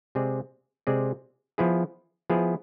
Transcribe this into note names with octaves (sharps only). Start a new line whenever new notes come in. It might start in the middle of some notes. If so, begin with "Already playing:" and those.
C3 G#3 C4 G#4 D5
C3 G#3 C4 G#4 D5
F3 B3 E4 G#4
F3 B3 E4 G#4